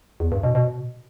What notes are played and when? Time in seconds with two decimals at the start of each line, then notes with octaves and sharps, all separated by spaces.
0.20 E2
0.32 G2
0.43 B2
0.55 B2